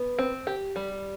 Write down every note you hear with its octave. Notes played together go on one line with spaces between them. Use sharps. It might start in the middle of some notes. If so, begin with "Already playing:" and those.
Already playing: B3
C4
G4
G3